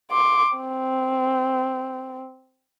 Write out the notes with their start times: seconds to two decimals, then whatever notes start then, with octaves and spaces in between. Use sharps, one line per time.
0.12 C6 D6
0.58 C4